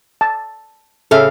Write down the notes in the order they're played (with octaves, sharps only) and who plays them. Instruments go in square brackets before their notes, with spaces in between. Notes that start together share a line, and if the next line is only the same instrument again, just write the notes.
[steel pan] A5
[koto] A2 C#3 F5 [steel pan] A4 E5